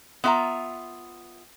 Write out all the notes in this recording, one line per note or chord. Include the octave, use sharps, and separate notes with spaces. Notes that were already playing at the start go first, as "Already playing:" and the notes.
B3 F4 E5 G5 A#5